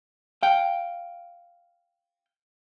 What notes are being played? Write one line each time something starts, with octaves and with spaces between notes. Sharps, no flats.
F5 G5